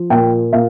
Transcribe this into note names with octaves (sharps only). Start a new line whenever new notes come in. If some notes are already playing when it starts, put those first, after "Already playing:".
Already playing: F3
A#2 G5
A#2 F5